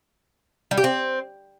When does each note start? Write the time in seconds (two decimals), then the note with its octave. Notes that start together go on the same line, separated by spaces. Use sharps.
0.71 G3
0.78 G4
0.84 C4